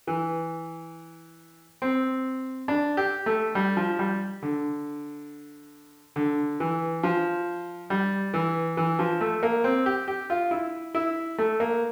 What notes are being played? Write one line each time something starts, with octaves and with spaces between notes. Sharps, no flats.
E3
C4
D4
G4
A3
G3
F3
G3
D3
D3
E3
F3
G3
E3
E3
F3
A3
A#3
C4
G4
G4
F4
E4
E4
A3
A#3